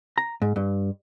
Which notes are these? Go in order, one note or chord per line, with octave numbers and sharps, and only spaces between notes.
A#5
G#2
G2